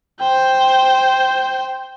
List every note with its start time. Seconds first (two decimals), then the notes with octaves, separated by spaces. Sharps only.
0.20 C5 G5